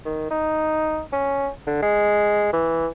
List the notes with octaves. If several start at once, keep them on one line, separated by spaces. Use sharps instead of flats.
D#3
D#4
C#4
D3
G#3
E3